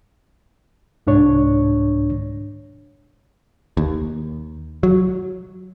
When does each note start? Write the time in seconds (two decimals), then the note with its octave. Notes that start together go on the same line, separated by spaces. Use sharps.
1.07 C2 G#2 D4 C#5
3.77 D#2
4.83 F#3